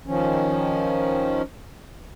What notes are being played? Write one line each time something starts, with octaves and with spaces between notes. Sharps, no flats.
D#3 F3 C#4